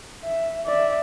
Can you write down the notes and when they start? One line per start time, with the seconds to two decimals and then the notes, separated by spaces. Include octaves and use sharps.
0.23 E5
0.66 D5 E5